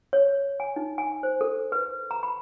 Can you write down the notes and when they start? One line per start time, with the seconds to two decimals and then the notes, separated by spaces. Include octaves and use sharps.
0.13 C#5
0.60 G#5
0.76 D#4
0.98 G#5
1.23 C5
1.41 A4
1.72 B4
2.11 A#5
2.23 B5